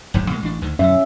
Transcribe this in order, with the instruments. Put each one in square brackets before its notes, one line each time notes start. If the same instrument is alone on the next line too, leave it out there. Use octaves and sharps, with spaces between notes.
[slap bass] F#1 D#2 G#2
B2 G#3 A#3
A1 D4
D2 D3 D#3
[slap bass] F#2 B2 D3 [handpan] C#4 E5